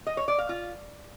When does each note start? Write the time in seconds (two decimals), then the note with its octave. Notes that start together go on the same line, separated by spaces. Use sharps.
0.07 D#5
0.17 C#5
0.28 D5
0.38 F5
0.49 F4